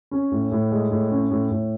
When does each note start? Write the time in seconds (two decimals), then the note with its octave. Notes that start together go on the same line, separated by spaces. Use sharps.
0.11 C#4
0.31 A2
0.51 A2
0.72 G#3
0.91 A2
1.11 C#4
1.31 A2
1.51 A2